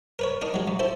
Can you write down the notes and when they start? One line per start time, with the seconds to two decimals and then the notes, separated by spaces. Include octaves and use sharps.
0.19 A#4 B4 C#5
0.41 D4 D#4 A#4
0.54 F#3 G#3
0.68 F#2
0.79 E4 A4 C5